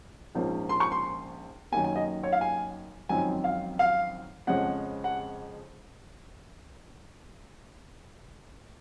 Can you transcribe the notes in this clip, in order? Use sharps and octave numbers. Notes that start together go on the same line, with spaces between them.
A#1 G#2 F3 A#3 C#4
C6
C#6
C6
F#2 D#3 A#3 G#5
G#5
D#5
C#5
F5
G#5
G#1 F#2 F3 C4 D#4 G#5
F5
F5
F2 C#3 F3 G#3 C#4 F#5
F#5